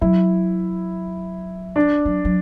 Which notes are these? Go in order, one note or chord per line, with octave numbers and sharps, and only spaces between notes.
F#3 E4
D4
F#3
F#3